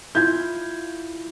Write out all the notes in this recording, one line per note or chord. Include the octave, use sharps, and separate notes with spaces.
E4 F4 G6 G#6